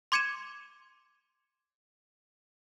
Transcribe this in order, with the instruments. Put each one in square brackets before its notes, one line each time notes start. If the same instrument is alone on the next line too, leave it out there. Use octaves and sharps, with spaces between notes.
[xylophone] C6 D6 G#6 C#7 D#7 E7